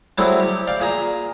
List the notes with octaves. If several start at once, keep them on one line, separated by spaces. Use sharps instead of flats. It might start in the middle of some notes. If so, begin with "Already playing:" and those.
F#3 G3 A3 C4 E4 G#4
G4
D5 F5 G5
A#2 G#4 A#5